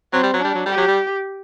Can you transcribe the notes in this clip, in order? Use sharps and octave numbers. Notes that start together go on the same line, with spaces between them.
F#3 C4
G3
F#3
G3 D4
F#3
G3 G4
F#3
G3